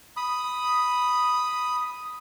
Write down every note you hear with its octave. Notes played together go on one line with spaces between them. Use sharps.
B5 D#6